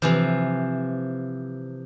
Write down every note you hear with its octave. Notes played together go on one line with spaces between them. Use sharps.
C3 E3 F3